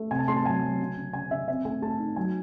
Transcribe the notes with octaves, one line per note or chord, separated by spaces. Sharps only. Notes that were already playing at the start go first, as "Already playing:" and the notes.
Already playing: A3
C3 G#5
A5
A3 C6
A5
F#3 G#5
F#3
C#3
C#3
C#3 G#5
C#3 E5
C4 E5
A3 G#5
A3 A5
D#4
F#3 G#5